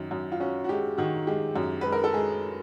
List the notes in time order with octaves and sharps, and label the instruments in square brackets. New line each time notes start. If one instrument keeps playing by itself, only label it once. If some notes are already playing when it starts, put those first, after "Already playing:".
Already playing: [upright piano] F#2 D#3
F#2
F4
C#4 F#4
F#4
G#3 G4
D#3 F#4
G#3 G4
F#2
G#3 B4
A#4
A4
G#3 G#4